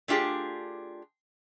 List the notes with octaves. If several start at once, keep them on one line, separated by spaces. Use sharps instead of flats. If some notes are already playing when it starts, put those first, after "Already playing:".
A3 D4 F4 G4 G#4